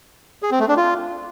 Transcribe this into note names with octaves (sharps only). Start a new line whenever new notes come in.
G#4
C4
A3
D4
F4